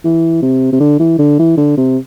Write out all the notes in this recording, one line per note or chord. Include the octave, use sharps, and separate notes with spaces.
E3
C3
C3
D3
E3
D3
E3
D3
C3